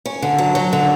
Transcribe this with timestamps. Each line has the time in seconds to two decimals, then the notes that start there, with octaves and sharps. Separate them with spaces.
0.06 C#4
0.22 D3
0.38 F#3
0.55 F#3
0.73 D3